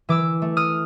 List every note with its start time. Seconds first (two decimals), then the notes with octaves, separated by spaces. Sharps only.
0.09 E3 D6 E6
0.42 A3
0.57 D#6 F6